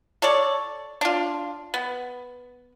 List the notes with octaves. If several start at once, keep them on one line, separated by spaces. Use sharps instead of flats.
A4 C#5 D5
D4 F4
B3